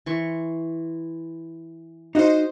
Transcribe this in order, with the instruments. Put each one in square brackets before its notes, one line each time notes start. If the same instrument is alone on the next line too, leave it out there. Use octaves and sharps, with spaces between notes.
[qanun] E3 C6 C#6
[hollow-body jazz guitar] D#4 F#4 F5 [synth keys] C5 D#5